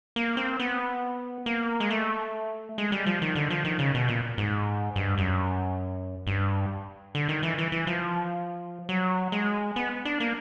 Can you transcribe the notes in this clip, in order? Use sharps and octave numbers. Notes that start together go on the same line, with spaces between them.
A#3
C4
B3
A#3
G#3
A3
G#3
G3
F3
D#3
D3
F3
D#3
C#3
B2
A#2
G#2
G2
F#2
G2
D3
D#3
E3
E3
E3
F3
F#3
G#3
B3
D4
A#3